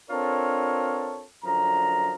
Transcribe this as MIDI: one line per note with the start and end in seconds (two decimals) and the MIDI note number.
0.10 1.24 60
0.10 1.24 62
0.10 1.24 65
0.10 1.24 69
0.10 1.24 70
0.10 1.24 73
1.44 2.15 42
1.44 2.15 50
1.44 2.15 53
1.44 2.15 82